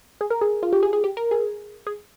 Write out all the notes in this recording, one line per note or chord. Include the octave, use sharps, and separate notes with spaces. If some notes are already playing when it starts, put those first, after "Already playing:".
G#4
A#4
G#4
F4
G4
G#4
G#4
G4
A#4
G#4
G#4